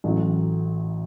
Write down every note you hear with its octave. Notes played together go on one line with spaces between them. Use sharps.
A1 A2 F#3